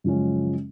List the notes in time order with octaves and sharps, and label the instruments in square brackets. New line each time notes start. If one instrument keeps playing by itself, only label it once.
[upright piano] F#2 C#3 F3 G#3 C#4